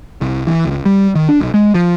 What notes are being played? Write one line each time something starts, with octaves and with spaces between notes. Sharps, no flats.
C2
E3
C#2
G3
D#3
D4
B1
G#3
F3